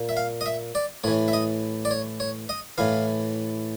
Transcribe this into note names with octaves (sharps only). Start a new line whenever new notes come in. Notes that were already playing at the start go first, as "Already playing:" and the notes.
Already playing: A#2
E5
F5
D#5
E5
D5
A2 E3 C#5
E5
D#5
D5
C#5
C#5
D#5
A2 E3 F5